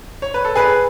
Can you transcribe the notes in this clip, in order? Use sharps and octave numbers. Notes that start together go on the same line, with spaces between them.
C#5
B4
A4
G#4 B4